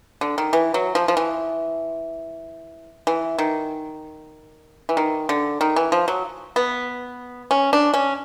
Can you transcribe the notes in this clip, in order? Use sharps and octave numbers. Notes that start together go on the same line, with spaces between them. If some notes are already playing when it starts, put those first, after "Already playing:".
D3
D#3
E3
F#3
F3
F3
E3
E3
D#3
E3
D#3
D3
D#3
E3
F3
F#3
B3
C#4
D4
C#4